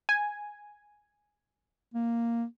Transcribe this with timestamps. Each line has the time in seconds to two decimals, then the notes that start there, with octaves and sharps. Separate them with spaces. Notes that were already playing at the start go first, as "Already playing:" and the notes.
0.09 G#5
1.94 A#3